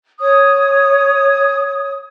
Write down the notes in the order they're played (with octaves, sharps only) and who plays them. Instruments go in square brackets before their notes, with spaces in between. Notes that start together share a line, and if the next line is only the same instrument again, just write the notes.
[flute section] C#5 D#6